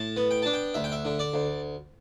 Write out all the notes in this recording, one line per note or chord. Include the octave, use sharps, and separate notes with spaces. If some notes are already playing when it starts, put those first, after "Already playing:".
Already playing: A2 A5
B3
G5
D4 A5
G5
D2 E5
G5
E5
D3
D5
D2